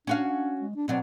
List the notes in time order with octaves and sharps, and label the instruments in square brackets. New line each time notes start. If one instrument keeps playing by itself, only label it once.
[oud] C#4 F#4 F5 [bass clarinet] D4
[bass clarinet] D4
G#3
D4
[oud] B2 F#3 D4 [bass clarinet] C4